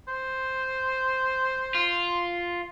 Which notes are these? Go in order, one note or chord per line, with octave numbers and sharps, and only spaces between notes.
C5
F4